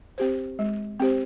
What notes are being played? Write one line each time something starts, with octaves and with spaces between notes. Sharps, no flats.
C4 G4 C5
G#3
C4 G4 C5